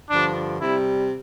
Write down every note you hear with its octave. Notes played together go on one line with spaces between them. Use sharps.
G2 D3 F3 D4
C3 G3 E4